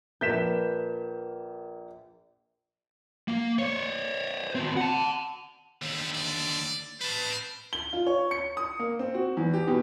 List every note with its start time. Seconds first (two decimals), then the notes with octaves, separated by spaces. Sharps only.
0.21 A#1 A#3 B4 E5 A5 G6 B6 E7
3.28 A#3
3.59 C5 C#5
4.55 C4 F#4
4.77 F#5 A5
5.82 D#2 D3 G4
6.13 D5
7.01 B4 C5 A5
7.73 G7
7.93 F4
8.07 C#5
8.31 C#7
8.57 D#6
8.79 A#3
8.99 C4
9.14 F#4
9.37 E2
9.54 G4
9.68 B2